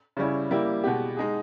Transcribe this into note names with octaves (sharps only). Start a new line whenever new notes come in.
C#3 G3 C#4 E4
G3 A#3 E4 G4
B2 G#3 B3 G4
G#3 D#4 G#4